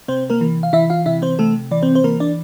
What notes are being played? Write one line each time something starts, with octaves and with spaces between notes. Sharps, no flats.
C3 C4 C5
A#3 A#4
E3
F5
E3 E4 E5
F4 F5
C3 E4 E5
C4 C5
C3 A3 A4
E3 D5
C4 C5
C5
E3 A#3 A#4
D4 D5